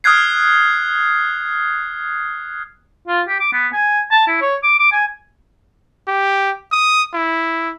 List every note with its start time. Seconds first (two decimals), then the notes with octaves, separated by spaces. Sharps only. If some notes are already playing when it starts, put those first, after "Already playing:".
0.04 D#6 F6 F#6 G#6 C7
3.08 F4
3.28 G4
3.40 D6
3.53 B3
3.73 G#5
4.11 A5
4.28 E4
4.42 C#5
4.63 D6
4.79 D6
4.92 G#5
6.08 G4
6.72 D#6
7.14 E4